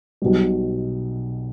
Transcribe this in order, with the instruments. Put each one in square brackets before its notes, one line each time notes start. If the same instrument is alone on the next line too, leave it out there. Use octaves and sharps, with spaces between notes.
[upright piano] B1 B2 G3